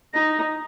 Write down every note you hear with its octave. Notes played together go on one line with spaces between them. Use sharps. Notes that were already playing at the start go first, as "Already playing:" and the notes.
D#4 A#6